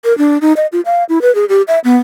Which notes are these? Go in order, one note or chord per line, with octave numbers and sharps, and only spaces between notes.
A#4
D4
D#4
D#5
F4
F5
E4
B4
G#4
G4
E5
B3